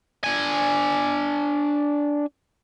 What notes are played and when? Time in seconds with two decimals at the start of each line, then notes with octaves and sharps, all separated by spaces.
0.24 D4 G#5